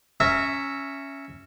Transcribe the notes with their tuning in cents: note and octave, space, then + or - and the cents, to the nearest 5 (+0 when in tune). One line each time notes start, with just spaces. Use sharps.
C#4 +0 E5 +0 A#5 -25